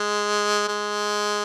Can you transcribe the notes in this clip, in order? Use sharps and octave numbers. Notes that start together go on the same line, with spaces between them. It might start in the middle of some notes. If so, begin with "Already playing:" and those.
Already playing: G#3
G#3